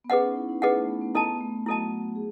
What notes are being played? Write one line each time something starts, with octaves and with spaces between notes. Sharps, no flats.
B3
C#4 G#4 B4 D#5 F#5
D#4
E4
D#4
B3 G#4 B4 D#5 F#5
A3
B3
B3
B3 E4 A4 D#5 A5
B3
A3
F#3 E4 F#4 A4 D#5 A5
G#4